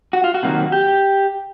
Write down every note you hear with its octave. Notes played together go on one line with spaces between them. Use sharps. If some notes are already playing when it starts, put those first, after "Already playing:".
F#4
F4
F#4
C3 D#3 F#3 A#3
G4